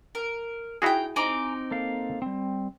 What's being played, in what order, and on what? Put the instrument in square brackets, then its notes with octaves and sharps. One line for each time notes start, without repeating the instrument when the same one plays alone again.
[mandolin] A#4
[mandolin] D#4 G5 [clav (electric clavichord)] E4 F#4 G#4
[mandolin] C4 D#4 D6 [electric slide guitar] G#5 A#5
[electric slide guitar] A#3 A4 F5
G3 C4